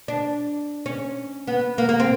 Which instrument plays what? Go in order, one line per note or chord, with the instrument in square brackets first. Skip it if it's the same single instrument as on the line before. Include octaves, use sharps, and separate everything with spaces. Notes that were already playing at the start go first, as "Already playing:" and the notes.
[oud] D4
C#4
B3
A#3
A#3
C4